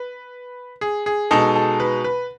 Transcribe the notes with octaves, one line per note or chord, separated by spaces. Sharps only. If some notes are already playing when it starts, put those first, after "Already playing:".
Already playing: B4
G#4
G#4
B2 G#3 D#4 A4
A4
B4
B4